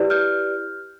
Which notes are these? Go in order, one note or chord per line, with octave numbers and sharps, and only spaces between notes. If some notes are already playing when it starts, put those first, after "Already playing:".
Already playing: E4 G4 B4 D5
F6 G6